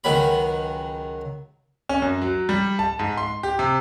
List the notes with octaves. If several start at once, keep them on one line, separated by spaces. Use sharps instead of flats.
C#2 D#3 F#3 B5
C#4
F#2
F#3
G3
A5
G#2
C6
G4
C3